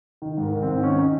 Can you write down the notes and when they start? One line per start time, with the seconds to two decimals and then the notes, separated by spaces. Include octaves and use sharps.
0.22 D#3
0.37 G#2
0.43 A#4
0.52 D#3
0.62 G#2 C4
0.83 D#3 C#4
0.98 D#4